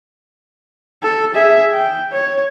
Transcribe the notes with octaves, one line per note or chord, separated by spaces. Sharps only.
A4
G#4 E5
G5
C#5